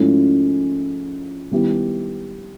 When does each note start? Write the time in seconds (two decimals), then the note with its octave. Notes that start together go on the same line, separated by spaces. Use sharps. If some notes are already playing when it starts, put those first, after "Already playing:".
Already playing: G#2 F3 A3 C#4 E4
1.51 D#3 G3 B3 E4 G4